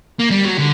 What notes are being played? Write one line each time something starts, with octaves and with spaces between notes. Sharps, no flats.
A#3
G3
F#3
D3